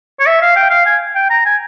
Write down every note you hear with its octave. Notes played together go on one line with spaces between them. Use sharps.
C#5
E5
F5
G5
F5
G#5
G5
A#5
G#5